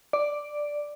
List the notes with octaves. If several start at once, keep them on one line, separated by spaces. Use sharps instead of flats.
D5